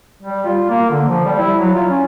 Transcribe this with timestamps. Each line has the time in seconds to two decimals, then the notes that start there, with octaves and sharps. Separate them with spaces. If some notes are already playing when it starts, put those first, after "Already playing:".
0.23 G3
0.45 F4
0.69 A#3
0.90 D3
1.08 F3
1.26 G3
1.39 E4
1.59 F#3
1.75 F4
1.89 C#4